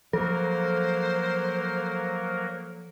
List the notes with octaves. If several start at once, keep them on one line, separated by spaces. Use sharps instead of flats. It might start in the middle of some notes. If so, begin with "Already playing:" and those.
F3 F#3 A#3 A4 A#4 C5